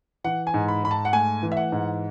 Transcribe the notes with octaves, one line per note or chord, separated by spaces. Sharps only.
E3 F#5
G#5
G#2
B5
G#2 B5
A5
F#5
A3 G#5
E3
E5
F#5
G#2